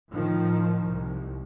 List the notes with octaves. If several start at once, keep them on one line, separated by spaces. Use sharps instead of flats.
A2 D#3 F3
C2